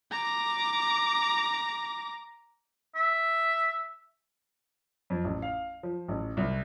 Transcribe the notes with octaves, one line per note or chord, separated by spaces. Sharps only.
A#5 D6
E5
F2
A1
F5
F3
A1
C2